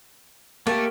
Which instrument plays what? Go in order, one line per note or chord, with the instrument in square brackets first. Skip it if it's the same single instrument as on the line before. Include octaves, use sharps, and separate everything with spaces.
[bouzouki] A3 [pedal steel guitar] A#3 G4